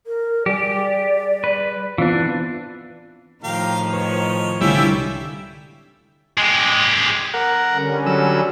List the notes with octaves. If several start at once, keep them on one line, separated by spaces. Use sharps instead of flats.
A#4
G3 G4 G#4 D5
B4
E3 B3 C4 D4 F4
A2 D#3 F3 G4 A#4 F5
B4 C#5
C2 D3 G3 C#4 E4 F4
G#3 G4
A#4 F#5
D3 G3 C#4
F#3 E6